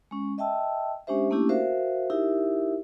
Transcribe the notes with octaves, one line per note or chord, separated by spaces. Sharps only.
G#3 C#4
D#5 E5 G5 A5 E6
G#3 C#4 D4 G4 C5 E5
A3 A#3 C#4 D4 E4 G4
F#4 A#4 C5 E5 F5
D#4 E4 G4 A#4 E5